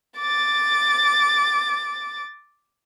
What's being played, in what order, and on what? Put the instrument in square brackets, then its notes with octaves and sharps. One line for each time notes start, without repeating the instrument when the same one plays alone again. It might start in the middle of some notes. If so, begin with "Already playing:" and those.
[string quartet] D6 A6